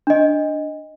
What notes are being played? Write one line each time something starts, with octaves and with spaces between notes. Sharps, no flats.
D4 D#5